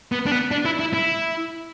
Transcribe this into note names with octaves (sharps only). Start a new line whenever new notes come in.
B3
D4
B3
D4
E4
E4
E4